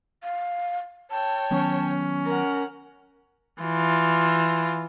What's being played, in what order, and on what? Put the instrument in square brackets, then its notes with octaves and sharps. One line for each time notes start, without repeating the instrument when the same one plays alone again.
[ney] F5
[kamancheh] C#5 G5 [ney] A5
[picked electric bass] D#3 F#3 B3 [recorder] C#4
[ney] A#4 [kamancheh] F#5 A#5
[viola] E3 F4